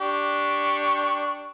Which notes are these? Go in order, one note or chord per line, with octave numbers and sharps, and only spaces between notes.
D4 G4 C#6